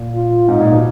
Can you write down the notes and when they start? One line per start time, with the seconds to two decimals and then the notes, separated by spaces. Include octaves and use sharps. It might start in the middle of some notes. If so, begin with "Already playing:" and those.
Already playing: A#2
0.15 F4
0.48 G#2 D#4
0.61 A#2
0.72 B2